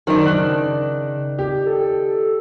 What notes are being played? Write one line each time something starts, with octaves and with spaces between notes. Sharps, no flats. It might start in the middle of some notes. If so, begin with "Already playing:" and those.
F#2 D#3 D4 C5
C#3 F#6
G4
A4